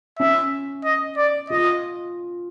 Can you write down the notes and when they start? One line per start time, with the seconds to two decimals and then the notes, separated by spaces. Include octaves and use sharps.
0.20 C#4 E5
0.85 D#5
1.17 D5
1.50 F4 D#5